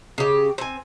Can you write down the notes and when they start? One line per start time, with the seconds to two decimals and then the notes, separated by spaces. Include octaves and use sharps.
0.18 C#3 G4
0.58 C4 G#5